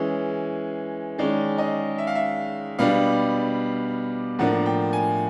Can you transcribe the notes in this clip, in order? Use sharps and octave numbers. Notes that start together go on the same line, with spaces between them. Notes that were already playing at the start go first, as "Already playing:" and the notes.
Already playing: E3 G#3 C#4 G#4
D#3 G#3 C#4 D5
D#5
E5
F5
E5
B2 G3 B3 D4 F5
A2 F3 A#3 D4 F#5
G5
G#5